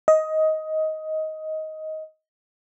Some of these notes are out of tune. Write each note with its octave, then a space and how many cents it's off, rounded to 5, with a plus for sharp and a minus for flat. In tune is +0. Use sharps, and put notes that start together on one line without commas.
D#5 +15